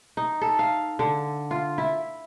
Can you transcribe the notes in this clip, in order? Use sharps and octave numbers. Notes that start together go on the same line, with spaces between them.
D#4
A4
F5
D3
F4
E4